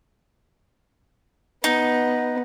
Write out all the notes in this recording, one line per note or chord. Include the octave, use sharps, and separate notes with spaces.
B3 D#4